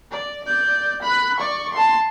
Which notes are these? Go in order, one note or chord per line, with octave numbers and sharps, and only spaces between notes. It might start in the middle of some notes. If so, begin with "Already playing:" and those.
D5
D5 G6
B5 F#6
D5 C#6
A5 C6